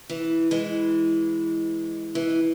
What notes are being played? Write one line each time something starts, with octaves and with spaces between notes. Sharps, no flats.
E3
E3 G#3
E3